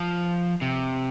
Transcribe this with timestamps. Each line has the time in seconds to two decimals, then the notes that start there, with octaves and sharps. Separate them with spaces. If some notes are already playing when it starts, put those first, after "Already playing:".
Already playing: F3
0.61 C3